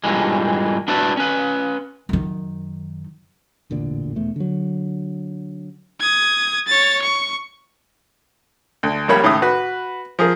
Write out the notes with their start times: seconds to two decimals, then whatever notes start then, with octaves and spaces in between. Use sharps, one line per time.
0.04 G2 A#2 C#3 E3 G#3
0.88 D4 E4 F#4 B4 D5
1.17 C#4 B4
2.09 F#2 D#3
3.70 E1 A1 A#2 D3
4.16 E1 E2 A3
4.36 D3 F#3
6.00 D#6 G#6
6.67 C#5 A6
7.02 C#6
8.83 D2
9.08 A#1 G3 A#3 C#5 B5
9.23 C#2 A2 D#3 D#6
9.42 F#4 B4
10.19 F3 G#4 A#4